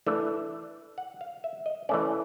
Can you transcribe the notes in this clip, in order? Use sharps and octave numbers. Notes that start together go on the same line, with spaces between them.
E3 A3 D4
F#5
F5
E5
D#5
E3 A3 C#4 D5